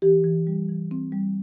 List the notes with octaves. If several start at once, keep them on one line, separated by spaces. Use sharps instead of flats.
E3 G4
E3
G3
E3
C4
G3